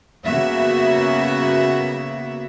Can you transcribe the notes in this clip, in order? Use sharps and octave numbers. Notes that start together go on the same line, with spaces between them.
C#3 A#3 B3 F#4 E5